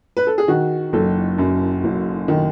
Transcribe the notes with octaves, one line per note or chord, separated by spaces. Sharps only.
B4
A4
G#4
D#3 F#4
F#1 A4
F#2
F#1
D#3